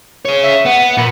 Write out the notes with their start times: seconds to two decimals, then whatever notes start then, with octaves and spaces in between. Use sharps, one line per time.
0.25 G#4 C#5
0.43 E5
0.65 B3 F#5
0.97 A#2 B5